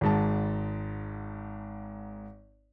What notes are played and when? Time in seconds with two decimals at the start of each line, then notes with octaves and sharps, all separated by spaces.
0.01 G#1 G#2 A5